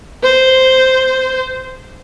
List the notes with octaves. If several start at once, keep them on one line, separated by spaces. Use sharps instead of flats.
C5